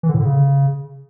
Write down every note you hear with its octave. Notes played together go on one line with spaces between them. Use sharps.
E3
D3
A2
D3
C#3